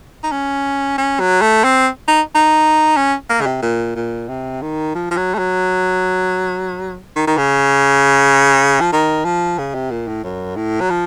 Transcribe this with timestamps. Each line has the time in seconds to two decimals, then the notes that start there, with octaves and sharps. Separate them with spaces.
0.23 D#4
0.32 C#4
0.98 C#4
1.20 F#3
1.42 A3
1.64 C4
2.08 D#4
2.35 D#4
2.97 C#4
3.30 A#3
3.41 C#3
3.46 C3
3.62 A#2
3.96 A#2
4.29 C3
4.62 D#3
4.95 F3
5.11 F3
5.17 F#3
5.35 A3
5.38 F#3
7.16 D#3
7.27 D#3
7.38 C#3
8.81 F3
8.92 D#3
9.25 F3
9.58 C#3
9.75 C3
9.91 A#2
10.08 A2
10.24 F#2
10.57 A2
10.81 F#3
10.90 F3